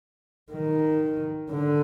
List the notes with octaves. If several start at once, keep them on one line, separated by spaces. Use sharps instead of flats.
D#3
D3